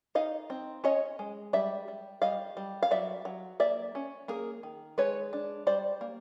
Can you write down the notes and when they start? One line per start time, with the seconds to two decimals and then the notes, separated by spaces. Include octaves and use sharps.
0.15 D#4 D#5 F5
0.50 C4
0.84 C#4 C#5 D#5
1.19 G#3
1.53 G3 D5 E5
1.88 G3
2.22 G3 D#5 F5
2.57 G3
2.83 F5
2.91 F#3 D5 E5
3.25 F#3
3.60 A#3 D5 E5
3.95 C#4
4.28 A#3 G#4 A#4
4.63 D#3
4.98 G#3 B4 C#5
5.33 D4
5.67 G3 C5 D5
6.01 A#3